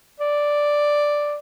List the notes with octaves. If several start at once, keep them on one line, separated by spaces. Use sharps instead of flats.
D5